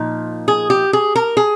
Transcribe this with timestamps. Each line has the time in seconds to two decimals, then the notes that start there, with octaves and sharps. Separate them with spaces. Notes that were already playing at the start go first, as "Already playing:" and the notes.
Already playing: A#2 F3 D#4
0.48 G#4
0.70 G4
0.93 G#4
1.15 A#4
1.37 G#4